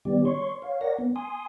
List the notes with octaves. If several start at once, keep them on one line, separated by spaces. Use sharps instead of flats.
D#3 G3 B3 G4 D5
C#5 C6 C#6
C#5 F5
A#4 C#5 D5 F#5 A#6
B3
G#5 C6 D#6